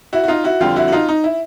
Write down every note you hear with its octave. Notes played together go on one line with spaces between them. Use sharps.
E4 F#4
F#4
D#4 F4
E4 F#4
F2 D3 G3 F4 G4
E4 F#4
F#4
D#4 F4
D#4
E4